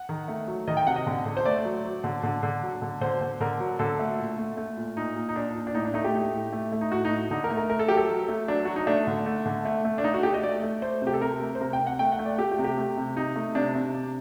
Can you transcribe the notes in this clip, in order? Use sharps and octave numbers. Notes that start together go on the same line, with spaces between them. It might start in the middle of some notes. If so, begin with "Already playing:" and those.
Already playing: F#5
D#3
A3
F#3
D#3 D#5
G5
C3 F#5
D#5
D3
D3
C5
A3 D5
F#3
F#3
D3
D3
D3
F#3
D3
D3 C5
D3
D3 A#4
F#3
D3 A4
A3
A#2
A3
A3
A#2
A#2 D#4
A#2
D#4
A#2 D4
A#2
D4
A2 D#4
D4
A3 D#4
G4
A3
A2
A3
A3
D#4
A2 F#4
D#4
A2
D3 D#4
A#4
A3
A#4
A3 A#4
A4
F#3 G4
A4
F#3
A3
F#3 D4
F#3 F#4
D#4
A3 D4
D3
A3
D3
A3
A3
D4
A3 D#4
F#4
A3 G4
D#5
A3 D5
A3
A3 C5
C3 G4
A4
C3 A#4
A3
C5
C3 A#4
G5
C3
F#5
A3 G5
F#5
A3
D5
A3 G4
G4
C3
G4
A3
C3
C3 D#4
A3
C3 D4
C3
C3